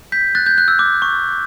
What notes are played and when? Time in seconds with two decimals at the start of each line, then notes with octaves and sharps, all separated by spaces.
0.12 G6 B6
0.35 F#6 A6
0.46 G6
0.58 F#6
0.68 E6
0.79 D6
1.02 C#6